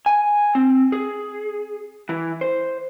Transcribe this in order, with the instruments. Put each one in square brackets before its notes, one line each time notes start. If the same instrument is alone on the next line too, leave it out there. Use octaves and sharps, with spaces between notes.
[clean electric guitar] G#5
C4
G#4
E3
C5